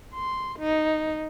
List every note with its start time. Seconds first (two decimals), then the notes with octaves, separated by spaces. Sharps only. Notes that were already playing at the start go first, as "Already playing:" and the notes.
0.13 C6
0.59 D#4